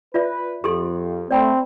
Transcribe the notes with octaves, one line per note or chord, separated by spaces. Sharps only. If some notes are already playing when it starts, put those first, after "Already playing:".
F4 B4 D5 E5
F2 G4 A4 C6
A3 C4 D5 G5 B5